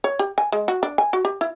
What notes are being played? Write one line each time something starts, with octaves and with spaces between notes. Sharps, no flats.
C#5
G4
G#5
G#3
F#4
D4
G#5
F#4
G4
E4